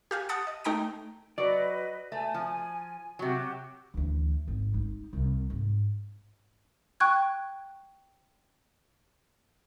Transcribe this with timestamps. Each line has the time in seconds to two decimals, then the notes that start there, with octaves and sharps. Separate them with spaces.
0.11 G4 F5 G#5
0.29 F#5 A5 D#6 A6 C#7
0.47 D#5
0.64 A3 D#4 G5 A#5 A#6 D7
1.38 F#3 B4 D5 D#5
2.12 A3 G#5
2.34 F3
3.19 C3 F#3 F#4 G4
3.94 D2 E3
4.48 G#1
4.73 G#3 D#4
5.13 C2 C3
5.50 G#2
7.00 G5 C#6 F#6 G#6